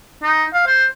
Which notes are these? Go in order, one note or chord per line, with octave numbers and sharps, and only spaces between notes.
D#4
F5
C5